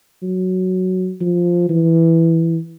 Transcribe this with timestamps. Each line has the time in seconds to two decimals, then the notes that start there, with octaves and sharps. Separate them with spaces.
0.22 F#3
1.21 F3
1.69 E3